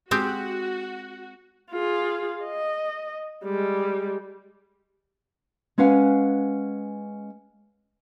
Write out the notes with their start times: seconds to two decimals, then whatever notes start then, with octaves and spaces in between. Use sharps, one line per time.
0.11 G#3 C4 F#4 G4
1.71 F4 G#4
2.43 D#5
3.44 G3 G#3
5.78 G#3 C#4 B4 F5 F#5 G#5